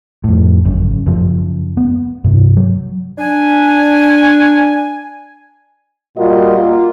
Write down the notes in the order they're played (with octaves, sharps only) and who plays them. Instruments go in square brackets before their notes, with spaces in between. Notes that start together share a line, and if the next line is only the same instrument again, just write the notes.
[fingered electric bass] F2 A2
G#1 F#2 C#3
F#2 C#3 F3
B3
G2 C3
F#3
[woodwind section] D4 G#5
[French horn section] A#2 G3 F4 F#4 A#4 D#5
A#3 F4